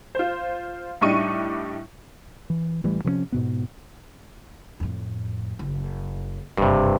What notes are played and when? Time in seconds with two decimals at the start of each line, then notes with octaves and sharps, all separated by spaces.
0.15 F4 C5
1.01 A2 G3 D4 D#4 C#6 D#7
2.50 E3
2.84 A1 E3 G3 A3
3.04 C3 F3 G#3 C#4
3.32 G#2 B2 B3
4.80 F2 A2
5.59 F#1
6.57 F#1 G2 C3